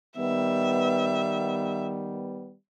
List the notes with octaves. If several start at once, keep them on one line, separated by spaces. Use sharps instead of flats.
D#3 G3 B3 E5